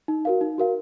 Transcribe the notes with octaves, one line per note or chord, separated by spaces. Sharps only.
D#4
F#4 A#4 F5
D#4
F#4 A#4 F5